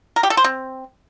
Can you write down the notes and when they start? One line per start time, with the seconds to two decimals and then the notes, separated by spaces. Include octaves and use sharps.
0.16 A#4
0.23 G4
0.30 A4
0.37 C5
0.44 C4